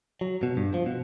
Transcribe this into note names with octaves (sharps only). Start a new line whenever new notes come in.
F#3
B2
G2
F3
B2